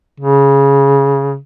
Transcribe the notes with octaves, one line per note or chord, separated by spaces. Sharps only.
C#3